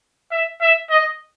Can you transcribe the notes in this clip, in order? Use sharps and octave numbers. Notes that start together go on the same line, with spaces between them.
E5
E5
D#5